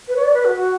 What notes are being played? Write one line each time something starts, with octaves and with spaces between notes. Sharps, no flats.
B4
C#5
D5
B4
F#4
F#4